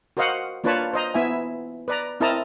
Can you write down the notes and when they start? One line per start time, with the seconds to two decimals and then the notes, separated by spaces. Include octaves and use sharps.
0.17 F#4 A#4 C5 D#5 F5 F#5
0.64 A#3 D4 F4 B4 C#5 A5
0.93 C5 D#5 A#5
1.14 B3 E4 E5 G#5
1.88 B4 D5 A#5
2.20 C4 E4 A#4 D#5 A5 A#5